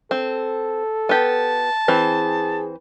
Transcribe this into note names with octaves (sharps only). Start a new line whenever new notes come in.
C4 A4
B3 G4 A5
E3 C4 G#4